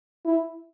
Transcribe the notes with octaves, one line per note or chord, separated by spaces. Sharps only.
E4